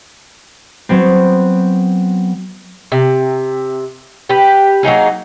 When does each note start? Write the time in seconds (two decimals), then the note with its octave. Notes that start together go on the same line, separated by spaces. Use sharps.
0.89 F#3 B3 C4
2.92 C3
4.29 G4 B4
4.83 F#3 A#3 D#4 G#4